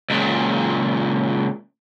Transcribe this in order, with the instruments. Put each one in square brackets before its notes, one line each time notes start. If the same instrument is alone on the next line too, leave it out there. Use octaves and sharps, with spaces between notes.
[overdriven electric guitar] C#2 A#2